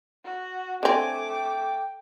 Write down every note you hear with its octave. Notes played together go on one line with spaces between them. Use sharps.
F#4
D3 A3 C4 G#5 D6
G5